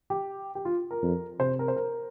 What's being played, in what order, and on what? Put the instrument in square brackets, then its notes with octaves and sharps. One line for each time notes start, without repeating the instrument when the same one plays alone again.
[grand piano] G4
G4
F4
A#4
[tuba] F2
[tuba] C3 [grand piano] C5
[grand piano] A#4
C5
A#4